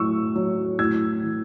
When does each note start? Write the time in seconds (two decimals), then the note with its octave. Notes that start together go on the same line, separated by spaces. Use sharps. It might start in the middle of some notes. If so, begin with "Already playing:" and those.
Already playing: A2 F#3 C#6 E6
0.36 F#3
0.79 A2 E6 G#6
1.23 E3